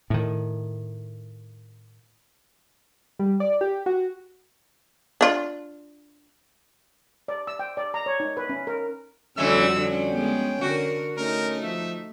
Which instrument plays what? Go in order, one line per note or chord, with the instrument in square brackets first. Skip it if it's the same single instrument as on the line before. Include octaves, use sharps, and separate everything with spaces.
[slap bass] A2 D#3
[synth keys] G3
D5
G4
F#4
[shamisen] D4 F4
[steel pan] D5
E6
G5
D5
A#5
C#5
D#4
B4
C#4
A#4
[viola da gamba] F2 G3 F#4 [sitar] D3 E3 A3 [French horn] C#4 [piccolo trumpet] E6
[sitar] D3 [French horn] C#4
[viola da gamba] G#3 B3 [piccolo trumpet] G5
[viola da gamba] D3 A#4 [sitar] F#4
[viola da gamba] A3 D#4 [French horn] C#4 [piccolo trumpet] A#4
[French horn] F3 [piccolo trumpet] E5